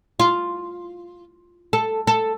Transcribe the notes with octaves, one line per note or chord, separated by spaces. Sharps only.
F4
A4
A4